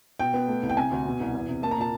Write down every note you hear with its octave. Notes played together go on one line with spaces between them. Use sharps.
B2 G5
B3
A3
C2
G5
C3 G#5
D2
B2
C2
E2
C3
A#3 A5
A#5
A#2 A5